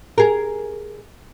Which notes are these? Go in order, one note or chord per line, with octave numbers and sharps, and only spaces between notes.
G#4 A#4